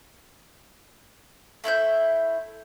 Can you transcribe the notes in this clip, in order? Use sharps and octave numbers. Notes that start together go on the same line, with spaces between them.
A3 E4 C5 G6